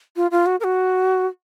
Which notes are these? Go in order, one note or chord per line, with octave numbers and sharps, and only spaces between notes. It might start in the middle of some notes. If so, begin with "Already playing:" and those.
F4
F4
F#4
A#4
F#4